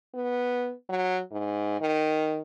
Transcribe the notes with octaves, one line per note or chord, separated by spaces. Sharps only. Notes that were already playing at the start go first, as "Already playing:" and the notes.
B3
F#3
G#2
D#3